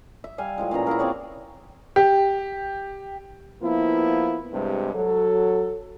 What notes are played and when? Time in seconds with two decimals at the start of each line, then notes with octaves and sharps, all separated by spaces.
0.24 E5
0.38 G3 F5 G#5
0.58 A2 F3 G#3
0.71 A#2 C#3 E3 A#5
0.87 E4 F#4 G#4 A#4
0.99 C4 G#4 C#5 D5
1.96 G4
3.63 F3 A#3 B3 E4
4.53 G2 C3 G#3
4.94 F#3 A4